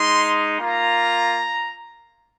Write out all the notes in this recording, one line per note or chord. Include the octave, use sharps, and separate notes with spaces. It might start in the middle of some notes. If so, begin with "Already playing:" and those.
Already playing: G#3 D#4 C6
A#3 F4 A#5